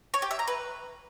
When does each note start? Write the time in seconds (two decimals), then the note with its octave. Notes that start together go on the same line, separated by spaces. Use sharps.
0.14 C#5
0.22 G4
0.31 E5
0.39 A#5
0.48 B4